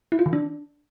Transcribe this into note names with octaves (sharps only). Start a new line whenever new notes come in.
E4
F4
D#3
D4